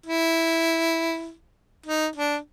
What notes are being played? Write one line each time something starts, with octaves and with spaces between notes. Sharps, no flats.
E4
D#4
D4